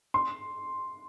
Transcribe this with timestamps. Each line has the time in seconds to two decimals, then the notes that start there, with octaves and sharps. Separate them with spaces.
0.14 C6